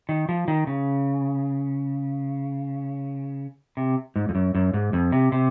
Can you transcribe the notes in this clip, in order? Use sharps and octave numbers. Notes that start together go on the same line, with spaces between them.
D#3
F3
D#3
C#3
C3
G#2
F2
F#2
F#2
G#2
F2
C3
C3